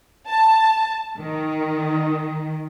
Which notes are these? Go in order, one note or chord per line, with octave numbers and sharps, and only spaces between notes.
A5
D#3